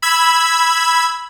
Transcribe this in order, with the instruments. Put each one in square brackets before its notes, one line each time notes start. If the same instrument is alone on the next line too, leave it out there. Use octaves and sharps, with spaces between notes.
[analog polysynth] B5 E6 G#6